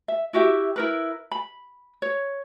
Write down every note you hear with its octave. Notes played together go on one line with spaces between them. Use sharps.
E5
E4 F#4 G4 E5
E4 A#4 B4
B5
C#5